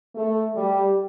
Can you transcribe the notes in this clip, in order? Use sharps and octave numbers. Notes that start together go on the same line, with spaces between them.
A3
G3